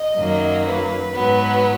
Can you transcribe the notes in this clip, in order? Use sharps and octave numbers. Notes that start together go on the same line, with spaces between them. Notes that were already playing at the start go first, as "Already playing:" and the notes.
Already playing: D#5
F#2 D#3 F#3 A#3
B4
G#2 F#3 B3